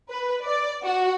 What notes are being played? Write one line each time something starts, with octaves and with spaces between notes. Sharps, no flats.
B4
D5
F#4